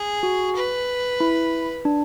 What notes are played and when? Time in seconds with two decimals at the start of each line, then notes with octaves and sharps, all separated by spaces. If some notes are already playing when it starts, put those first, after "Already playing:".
Already playing: G#4
0.23 F#4
0.55 B4
1.20 E4
1.85 D4